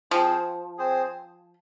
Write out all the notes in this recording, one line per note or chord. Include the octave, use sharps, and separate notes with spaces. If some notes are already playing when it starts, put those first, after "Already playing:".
F3 C4 G#4 C5
C4 G#4 C5